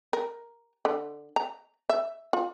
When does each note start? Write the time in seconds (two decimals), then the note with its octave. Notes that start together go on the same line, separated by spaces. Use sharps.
0.13 A#4
0.85 D3
1.36 A#5
1.89 E5
2.33 F4